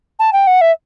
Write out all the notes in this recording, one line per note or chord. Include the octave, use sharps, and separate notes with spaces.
A5
G5
F#5
E5